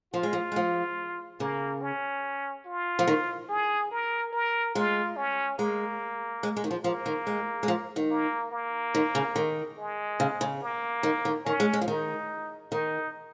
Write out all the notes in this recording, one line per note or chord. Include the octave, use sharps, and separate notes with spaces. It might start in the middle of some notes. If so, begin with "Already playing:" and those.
F3 F4
G#3
F3
G#3
F3
C#3 A#3
C#4
F4
F3
D#3
G#4
A#4
A#4
G#3 F4
C#4
G#3 A#3
G#3
G#3
D#3
F3
F3 A#3
D#3
G#3
G#3
F3
D#3
A#3
A#3
D#3
C#3
D#3
G#3
C#3
C#3
A#3
D#3
D#3
D#3 C#4
G#3
G#3
F3
D#3 D#4
D#3 D#4